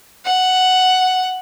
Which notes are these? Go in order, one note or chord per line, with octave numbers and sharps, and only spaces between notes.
F#5